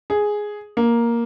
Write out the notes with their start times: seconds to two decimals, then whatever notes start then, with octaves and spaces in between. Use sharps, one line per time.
0.10 G#4
0.77 A#3